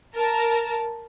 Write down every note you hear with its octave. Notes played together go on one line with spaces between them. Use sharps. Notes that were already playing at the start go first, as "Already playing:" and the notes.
A#4 A5